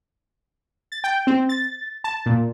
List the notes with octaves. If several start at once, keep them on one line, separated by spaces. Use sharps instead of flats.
A6
G5
C4
A6
A5
A#2